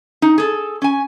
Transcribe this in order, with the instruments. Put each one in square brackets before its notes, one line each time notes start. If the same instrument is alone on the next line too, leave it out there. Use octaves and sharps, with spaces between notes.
[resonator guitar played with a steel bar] D#4
G#4 A4
C#4 G#5